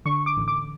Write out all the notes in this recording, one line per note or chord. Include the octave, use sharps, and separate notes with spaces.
D3 C#6
D6
A1
D6